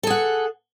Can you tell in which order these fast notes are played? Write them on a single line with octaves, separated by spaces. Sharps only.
A4 G#4 F#5